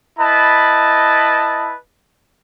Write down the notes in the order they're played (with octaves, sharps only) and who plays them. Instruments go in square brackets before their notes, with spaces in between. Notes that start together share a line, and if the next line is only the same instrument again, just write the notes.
[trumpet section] E4 B4 D#5 A5